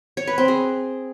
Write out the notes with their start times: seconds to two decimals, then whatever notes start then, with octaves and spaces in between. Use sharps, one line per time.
0.17 C#5
0.27 B4
0.38 C4
0.48 G#4